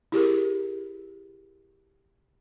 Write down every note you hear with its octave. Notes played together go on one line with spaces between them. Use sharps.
E4 G4 G#4 A#4